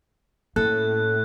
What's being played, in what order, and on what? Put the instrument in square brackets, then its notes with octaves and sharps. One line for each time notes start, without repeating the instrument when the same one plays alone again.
[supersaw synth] A2 [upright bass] A#3 C#4 [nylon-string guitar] A4 [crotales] F#6